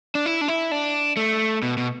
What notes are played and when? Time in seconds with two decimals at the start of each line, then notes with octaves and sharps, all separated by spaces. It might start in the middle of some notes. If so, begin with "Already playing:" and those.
0.15 D4
0.26 E4
0.41 D4
0.48 E4
0.72 D4
1.17 A3
1.63 B2
1.77 B2